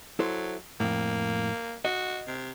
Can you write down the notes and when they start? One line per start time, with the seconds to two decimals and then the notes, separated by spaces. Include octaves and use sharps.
0.19 F#3 E4 A4 C5
0.80 F2 A2 A#3
1.85 F#4 D#5
2.27 C3